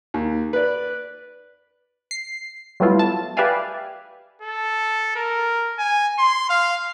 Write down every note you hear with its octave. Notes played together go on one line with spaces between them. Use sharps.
D#2
B4 D5
C7
F#3 G3 A3 B3 E4 F4
A5
G4 B4 D5 E5 F5 G#5
A4
A#4
G#5
C6
F5